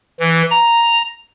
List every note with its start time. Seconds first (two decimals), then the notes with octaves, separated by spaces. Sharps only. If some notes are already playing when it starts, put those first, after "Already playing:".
0.20 E3
0.51 A#5